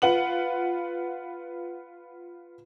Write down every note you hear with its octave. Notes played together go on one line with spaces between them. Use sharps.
F4 B4 F#5 F#7